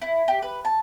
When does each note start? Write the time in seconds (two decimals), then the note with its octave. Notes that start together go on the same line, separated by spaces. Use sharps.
0.02 E4
0.28 G4
0.42 B4
0.65 A5